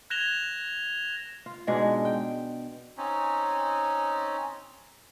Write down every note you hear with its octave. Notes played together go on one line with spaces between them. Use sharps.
F#6 G#6 A#6 E7 F7 G7
F4
G#2 B2 G#3 D4
G5
C4 C#4 D#4